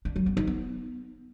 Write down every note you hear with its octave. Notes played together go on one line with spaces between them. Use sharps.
D4
F#3
B3
D#4
B3